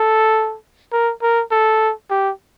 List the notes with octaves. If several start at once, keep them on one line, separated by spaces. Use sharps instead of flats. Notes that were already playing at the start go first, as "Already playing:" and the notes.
Already playing: A4
A#4
A#4
A4
G4